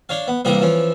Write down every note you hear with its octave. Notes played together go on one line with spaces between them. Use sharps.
D4 C#5 F5
B3
C2 C3 E3 A#3 G4 D#6
E3 F3 C#4